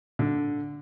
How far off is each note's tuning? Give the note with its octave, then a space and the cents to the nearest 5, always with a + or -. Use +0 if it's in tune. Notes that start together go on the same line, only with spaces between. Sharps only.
D3 -5